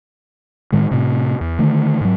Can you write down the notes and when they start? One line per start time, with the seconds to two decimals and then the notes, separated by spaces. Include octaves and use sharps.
0.72 A2 D#3 G#3
0.91 A2 C3
1.41 E2
1.59 D3 D#3 A3
2.01 G#2 F#3